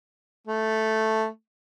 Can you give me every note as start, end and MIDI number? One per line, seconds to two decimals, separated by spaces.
0.47 1.26 57